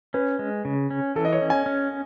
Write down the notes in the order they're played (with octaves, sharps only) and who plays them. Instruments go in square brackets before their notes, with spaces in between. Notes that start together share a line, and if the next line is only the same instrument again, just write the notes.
[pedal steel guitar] C#4 [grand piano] B4
[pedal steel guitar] G#3
C#3
C#4
[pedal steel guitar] E3 [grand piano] A4
[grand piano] D#5
C#5
[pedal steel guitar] C#4
[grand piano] G#5
[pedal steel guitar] C#4